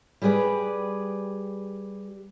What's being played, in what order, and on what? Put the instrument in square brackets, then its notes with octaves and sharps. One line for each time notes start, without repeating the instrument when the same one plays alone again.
[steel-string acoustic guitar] G3 G4 G#4 B4 D5